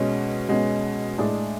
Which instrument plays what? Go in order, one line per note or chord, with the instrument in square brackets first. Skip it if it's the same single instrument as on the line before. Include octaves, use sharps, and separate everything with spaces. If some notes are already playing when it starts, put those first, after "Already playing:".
Already playing: [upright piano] B2 G#3 C#4
B2 G#3 C#4
A2 G#3 D4 G#4